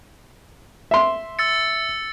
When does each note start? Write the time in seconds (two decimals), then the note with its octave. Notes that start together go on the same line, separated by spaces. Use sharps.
0.91 E5 C6
1.39 E6 A6 C#7